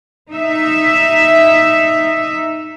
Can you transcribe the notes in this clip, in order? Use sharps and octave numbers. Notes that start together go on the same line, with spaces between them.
D#4 E5